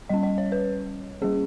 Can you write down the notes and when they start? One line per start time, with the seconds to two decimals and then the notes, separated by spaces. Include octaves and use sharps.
0.09 G3 C#4 D#5
0.23 D#5
0.38 C#5
0.52 B4
1.22 G3 A#3 C#4 G#4